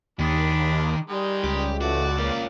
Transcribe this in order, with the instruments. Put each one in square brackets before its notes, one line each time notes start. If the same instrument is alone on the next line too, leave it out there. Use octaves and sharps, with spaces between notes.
[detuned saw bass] D#2 [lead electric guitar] D#3 [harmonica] G#3 D4 B5
[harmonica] D#3 G#3 [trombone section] G3
[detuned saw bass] C#2 [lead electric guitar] G4
[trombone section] A1 A3 [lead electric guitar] F#4 [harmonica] D5
[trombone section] A#3 [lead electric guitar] C#4 F4